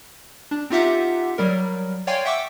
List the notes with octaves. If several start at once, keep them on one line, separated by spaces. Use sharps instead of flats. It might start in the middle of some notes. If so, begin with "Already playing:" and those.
D4
C4 D#4 F4 G4 E5 F#5
F#3 G3 A#4
C#5 D5 F5 G5 G#5 C6
E5 F#5 G5 C#6 D6 E6